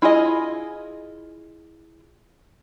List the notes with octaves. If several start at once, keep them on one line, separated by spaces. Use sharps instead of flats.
E4 F4 G#4 D#5